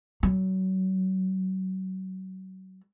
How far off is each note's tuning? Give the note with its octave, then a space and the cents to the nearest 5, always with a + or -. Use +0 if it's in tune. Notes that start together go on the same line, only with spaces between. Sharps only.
F#3 +30